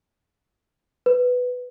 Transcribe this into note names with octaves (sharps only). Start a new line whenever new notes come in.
B4